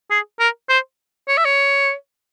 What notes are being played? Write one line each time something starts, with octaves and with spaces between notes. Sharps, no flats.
G#4
A#4
C5
C#5
E5
C#5